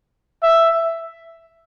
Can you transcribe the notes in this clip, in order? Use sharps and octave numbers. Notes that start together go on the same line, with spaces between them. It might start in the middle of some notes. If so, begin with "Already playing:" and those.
E5